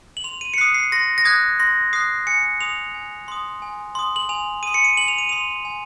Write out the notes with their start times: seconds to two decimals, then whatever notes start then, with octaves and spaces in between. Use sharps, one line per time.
0.17 F#7
0.24 C6 F7
0.41 D#7
0.54 C#7
0.58 D#6 F#6 C7
0.74 C7
0.92 C6 A#6
1.18 A#6
1.25 D#6 F#6 G#6
1.60 C6 A#6
1.93 D#6 F#6 C7
2.27 G#5 C#7
2.61 C6 D#6 F7
2.94 G#5
3.28 C6 D#6
3.62 G#5
3.95 C6 D#6
4.16 F#7
4.29 G#5 F7
4.63 C6 D#6 D#7
4.74 C#7
4.84 D#7
4.97 G#5 F#7
5.08 F7
5.18 D#7
5.29 C6 D#6 F7
5.65 G#5